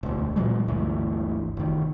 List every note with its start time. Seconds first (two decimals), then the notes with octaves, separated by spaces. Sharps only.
0.03 E1 D2
0.36 A#2 E3 F#3 G#3
0.68 G1 D2 E3
1.57 F1 D#3